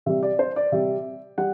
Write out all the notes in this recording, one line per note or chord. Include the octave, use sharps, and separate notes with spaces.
C3 G3 E5
D5
C5
D5
C3 G3 E5
G3 F#5